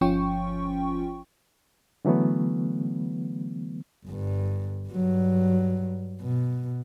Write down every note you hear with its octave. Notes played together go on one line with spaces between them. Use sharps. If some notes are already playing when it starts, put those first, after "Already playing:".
G1 F3 C#4 F4 G5 C#6
D3 E3 F#3 A3 B3
G1 G2
G2 F#3
B2